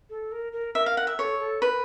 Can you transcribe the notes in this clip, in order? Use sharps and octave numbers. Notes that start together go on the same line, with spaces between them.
A4
A#4
A#4
A#4 E5
F5
F#5
E5
A4 C#5
A4
A#4 B4